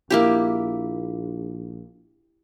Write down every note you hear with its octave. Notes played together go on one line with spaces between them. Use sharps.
A#1 A#3 E4 G4